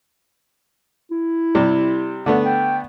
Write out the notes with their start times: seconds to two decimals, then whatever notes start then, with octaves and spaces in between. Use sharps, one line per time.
1.11 E4
1.55 C3 G3
2.26 D3 A3 B3
2.45 G5